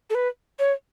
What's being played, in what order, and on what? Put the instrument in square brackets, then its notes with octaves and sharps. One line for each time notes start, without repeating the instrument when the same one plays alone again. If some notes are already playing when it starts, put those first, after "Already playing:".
[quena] A4
B4
C#5